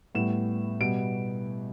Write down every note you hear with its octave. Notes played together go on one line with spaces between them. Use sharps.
A2 G3 B3 E7
B2 G3 B3 D7